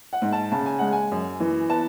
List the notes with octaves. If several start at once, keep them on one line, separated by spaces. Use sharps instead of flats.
F#5
G#2
A5
C#3 A5
G#5
G#3 F#5
G#5
F#2
E3
B3 A5